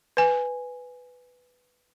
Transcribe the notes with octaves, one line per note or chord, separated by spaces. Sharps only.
B4 G#5